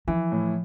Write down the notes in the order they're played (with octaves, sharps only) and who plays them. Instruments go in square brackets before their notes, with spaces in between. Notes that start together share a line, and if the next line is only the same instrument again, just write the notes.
[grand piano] E3 [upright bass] F3
[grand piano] A2